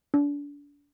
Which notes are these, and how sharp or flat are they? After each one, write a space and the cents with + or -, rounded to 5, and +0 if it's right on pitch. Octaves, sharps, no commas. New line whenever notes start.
D4 -35